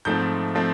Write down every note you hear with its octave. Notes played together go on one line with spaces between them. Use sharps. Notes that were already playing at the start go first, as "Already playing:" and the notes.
G#2 F3 A3 C4 G6
F3 A3 C4